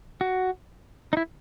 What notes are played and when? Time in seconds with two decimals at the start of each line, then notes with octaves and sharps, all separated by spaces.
0.21 F#4
1.13 D#4
1.17 E4